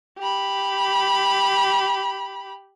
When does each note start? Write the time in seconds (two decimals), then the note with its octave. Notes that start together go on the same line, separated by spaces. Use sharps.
0.18 G4 B5